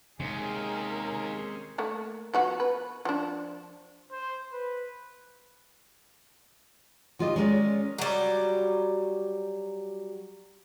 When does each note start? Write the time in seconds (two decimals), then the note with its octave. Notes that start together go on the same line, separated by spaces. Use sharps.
0.20 D#2 C3 G#3 C4 C#4 G#4 A#4
1.78 A3 A#3
2.34 F3 B3 F#4
2.60 B4
3.05 F3 D4
4.12 C5
4.53 B4
7.19 D#3 F4 G4 D#5
7.36 G#3 C#4 A#4 C#5 D5
7.98 F#3 G3